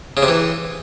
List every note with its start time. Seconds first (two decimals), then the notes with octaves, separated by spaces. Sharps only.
0.17 C#3
0.23 C3
0.28 E3